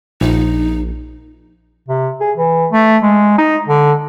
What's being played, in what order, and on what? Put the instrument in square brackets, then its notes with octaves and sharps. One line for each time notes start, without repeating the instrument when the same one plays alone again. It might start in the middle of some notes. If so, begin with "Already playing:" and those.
[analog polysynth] A#1 [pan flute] D#4
[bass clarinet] C3
G#4
E3
A3
G#3
D#4
D3